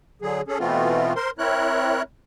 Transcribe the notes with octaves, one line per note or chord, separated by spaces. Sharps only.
D3 F#3 G#4
C#4 G#4 A4
B2 E3 A3 B3 C4 F4
A#4 C5 C6
C4 E4 A#4 C#5 F#6